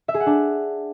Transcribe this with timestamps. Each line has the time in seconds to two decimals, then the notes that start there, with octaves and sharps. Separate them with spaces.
0.08 E5
0.14 G#4
0.20 F#5
0.26 D4